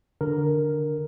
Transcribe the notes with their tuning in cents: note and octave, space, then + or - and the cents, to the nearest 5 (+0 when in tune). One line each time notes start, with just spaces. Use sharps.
D3 +0 A#4 +0